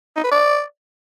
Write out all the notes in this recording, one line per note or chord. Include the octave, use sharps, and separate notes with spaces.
D#4
B4
D5